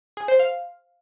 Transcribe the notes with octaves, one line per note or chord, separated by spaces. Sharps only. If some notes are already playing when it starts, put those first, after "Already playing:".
G#4
C5
F5